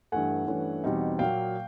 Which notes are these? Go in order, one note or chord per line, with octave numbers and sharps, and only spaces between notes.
G2 E3 A3 F#5 G#5
G2 E3 A3 C#4
E2 B2 G3 C4 D#4
A#2 F#3 A#3 F5 G5